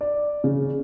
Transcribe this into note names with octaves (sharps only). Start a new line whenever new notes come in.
D5
C#3